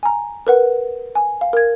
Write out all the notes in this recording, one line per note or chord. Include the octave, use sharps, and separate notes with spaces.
G#5 A#5
A#4 B4 F#5
G#5
F5
A#4 G#6